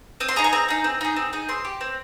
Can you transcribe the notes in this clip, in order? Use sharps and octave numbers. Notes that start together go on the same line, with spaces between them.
C4 D#6
C6
D#4 G#4 A#5
G#5
C4 A#5
D#4 G#4
C4
D#4 G#4
C4
D#4 G#4
C4 C6
G4
C4